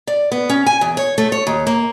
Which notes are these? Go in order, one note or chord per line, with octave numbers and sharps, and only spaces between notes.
D5
B3
C#4
G#5
E2
C#5
A3
C#5
D#2
A#3